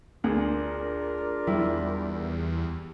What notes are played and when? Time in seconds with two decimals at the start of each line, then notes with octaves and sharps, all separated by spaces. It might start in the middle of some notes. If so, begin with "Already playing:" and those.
0.24 D2 D4 F4 G#4 A#4
1.47 E2 G3 E4